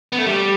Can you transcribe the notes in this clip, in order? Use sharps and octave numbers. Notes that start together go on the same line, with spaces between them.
B3
A3
G3